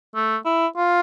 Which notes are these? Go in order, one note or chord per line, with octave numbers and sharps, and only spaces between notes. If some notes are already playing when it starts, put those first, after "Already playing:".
A3
E4
F4